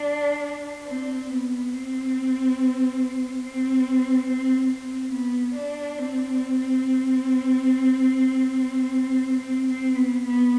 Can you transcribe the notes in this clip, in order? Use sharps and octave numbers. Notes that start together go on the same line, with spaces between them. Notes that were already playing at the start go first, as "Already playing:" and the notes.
Already playing: D4
C4
B3
C4
C4
C4
C4
B3
D4
C4
C4
C4
B3
B3